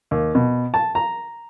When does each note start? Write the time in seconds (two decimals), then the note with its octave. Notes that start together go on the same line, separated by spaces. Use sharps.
0.11 D#2
0.35 B2
0.74 A5
0.95 A#5